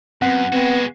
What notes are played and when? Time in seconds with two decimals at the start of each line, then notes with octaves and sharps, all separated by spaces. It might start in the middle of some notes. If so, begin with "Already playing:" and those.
0.22 F#2 B3 C4 F#5
0.52 G#3 B3 C4 F#4 G5